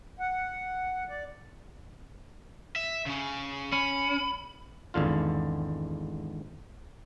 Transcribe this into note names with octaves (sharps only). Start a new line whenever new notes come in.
F#5
D5
E5
C#3 C#4
C#4 B5
G#1 E2 D3 F4